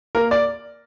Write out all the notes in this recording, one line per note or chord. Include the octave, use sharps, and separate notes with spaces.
A#3 A#4
D5